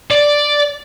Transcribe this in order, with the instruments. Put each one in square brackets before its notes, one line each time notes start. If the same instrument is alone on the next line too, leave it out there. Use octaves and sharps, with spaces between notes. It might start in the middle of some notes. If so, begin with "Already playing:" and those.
[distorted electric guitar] D5